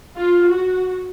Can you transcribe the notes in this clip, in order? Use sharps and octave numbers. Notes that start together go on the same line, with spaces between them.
F4
F#4